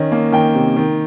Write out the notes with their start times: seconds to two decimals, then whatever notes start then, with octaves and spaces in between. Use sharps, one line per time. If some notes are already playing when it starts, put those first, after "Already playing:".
Already playing: D#3 C#4 D#5
0.12 A#3
0.32 D#3 G5
0.55 C3
0.76 D#3